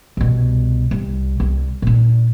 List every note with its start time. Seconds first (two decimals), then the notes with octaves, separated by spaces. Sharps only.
0.17 C2 B2
0.91 C2
1.40 C2
1.82 A#2 D4